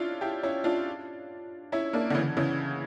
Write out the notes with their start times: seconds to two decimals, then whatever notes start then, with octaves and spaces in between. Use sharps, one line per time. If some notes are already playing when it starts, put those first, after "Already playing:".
Already playing: C#4 D4 E4 F4
0.21 E4 G4
0.43 C#4 E4
0.64 D4 F4
1.72 C#4 E4
1.93 A#3 D4
2.10 D3
2.15 C#3 E3
2.37 C#3 E3